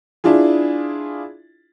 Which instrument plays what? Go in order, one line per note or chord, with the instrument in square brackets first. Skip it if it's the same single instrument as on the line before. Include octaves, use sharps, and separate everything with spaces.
[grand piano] D4 E4 F4 G#4